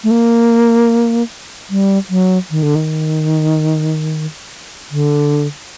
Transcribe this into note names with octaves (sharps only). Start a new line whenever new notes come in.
A3
A#3
G3
F#3
D#3
D3
D#3
D3